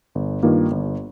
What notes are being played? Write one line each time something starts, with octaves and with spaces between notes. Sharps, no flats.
G1
G2 D#3 A#3 F4
G1